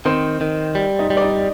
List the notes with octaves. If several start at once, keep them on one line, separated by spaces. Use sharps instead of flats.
D#3 C4 C5
D#3
G3
D#4 D#5
G3
D5
D#4 D#5